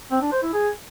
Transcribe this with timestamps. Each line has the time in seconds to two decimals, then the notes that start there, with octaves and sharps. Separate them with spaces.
0.11 C4
0.22 D4
0.32 C5
0.43 E4
0.53 G#4